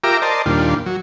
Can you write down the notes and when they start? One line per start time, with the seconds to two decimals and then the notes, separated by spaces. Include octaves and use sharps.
0.04 F4 G4 A#4 E5 A#5 D6
0.22 A#4 C5 D5 D#5 A5
0.46 D#2 A#2 G3 D4 F4
0.86 F#3